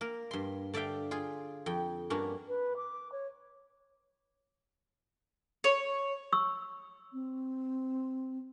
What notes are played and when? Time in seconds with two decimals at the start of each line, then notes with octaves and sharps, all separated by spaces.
0.01 A#3 A#4
0.31 G2 C6
0.74 D3 D5 E5 F5 G5
1.11 F4 G#4
1.66 F2 G5
2.10 G2 A#3 C#4 D4 F#4
2.48 B4
2.76 D6
3.12 C#5
5.64 C#5
6.32 C#6 E6
7.12 C4